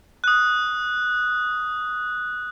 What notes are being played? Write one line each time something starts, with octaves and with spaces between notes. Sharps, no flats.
D#6 F#6